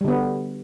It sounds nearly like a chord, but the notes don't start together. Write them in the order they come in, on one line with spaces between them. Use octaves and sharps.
G3 D3 B3